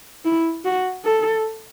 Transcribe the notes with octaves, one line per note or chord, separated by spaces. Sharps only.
E4
F#4
A4